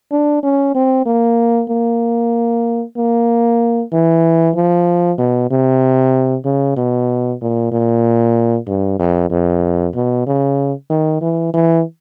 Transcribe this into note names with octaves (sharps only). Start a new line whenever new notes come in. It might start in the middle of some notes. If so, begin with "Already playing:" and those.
D4
C#4
C4
A#3
A#3
A#3
E3
F3
B2
C3
C#3
B2
A#2
A#2
G2
F2
F2
B2
C#3
D#3
E3
E3